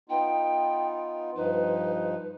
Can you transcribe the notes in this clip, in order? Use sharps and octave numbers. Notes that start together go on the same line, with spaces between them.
B3 D#4 F4 G5
G2 F3 D#4 B4